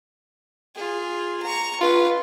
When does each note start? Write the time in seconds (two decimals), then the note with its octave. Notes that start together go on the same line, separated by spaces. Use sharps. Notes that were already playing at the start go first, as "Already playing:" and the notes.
0.75 F4 G#4
1.42 A#5 C#6
1.81 F4 B4